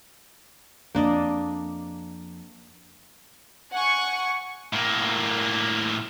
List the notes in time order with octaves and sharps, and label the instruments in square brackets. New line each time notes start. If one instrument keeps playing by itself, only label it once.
[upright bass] F2 [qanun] A#3 D4 D#5
[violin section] F#5 G#5 C#6
[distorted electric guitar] A2 A#3